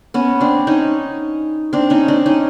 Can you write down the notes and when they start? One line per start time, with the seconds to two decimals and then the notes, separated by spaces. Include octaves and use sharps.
0.14 B3 C#4
0.41 C4 D4
0.67 C#4 D#4
1.73 C4 D4
1.90 C#4 D#4
2.08 C4 D4
2.26 C#4 D#4